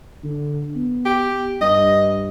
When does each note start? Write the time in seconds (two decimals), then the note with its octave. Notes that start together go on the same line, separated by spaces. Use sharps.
0.24 D3
0.76 B3
1.05 G4
1.61 G2 D#5